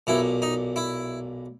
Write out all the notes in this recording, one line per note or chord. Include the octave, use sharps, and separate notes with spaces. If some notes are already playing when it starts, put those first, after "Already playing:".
B1 A#2 E4
D#4
E4